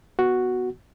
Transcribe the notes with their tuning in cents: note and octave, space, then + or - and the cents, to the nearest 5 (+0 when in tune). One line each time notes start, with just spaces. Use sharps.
B3 +0 F#4 +0